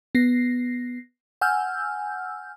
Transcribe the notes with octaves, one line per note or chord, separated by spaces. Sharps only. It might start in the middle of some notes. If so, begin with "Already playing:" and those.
B3 A#6 C7
F#5 G#5 E6 F6 G6